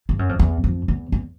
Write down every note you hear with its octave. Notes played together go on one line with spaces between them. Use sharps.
G2
F#2
F2
E2
F2
E2
E2